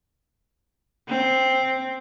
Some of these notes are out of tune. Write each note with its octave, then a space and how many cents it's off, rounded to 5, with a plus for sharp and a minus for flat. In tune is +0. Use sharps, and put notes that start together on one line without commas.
C4 +0